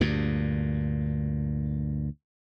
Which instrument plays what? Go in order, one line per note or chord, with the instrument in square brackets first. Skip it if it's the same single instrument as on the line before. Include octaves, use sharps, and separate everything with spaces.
[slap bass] D2 G2 A#2